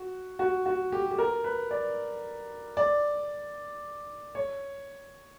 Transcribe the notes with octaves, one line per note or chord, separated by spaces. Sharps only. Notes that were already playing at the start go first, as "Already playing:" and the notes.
Already playing: F#4
F#4
F#4
G4
G4
A#4
B4
D5
D5
C#5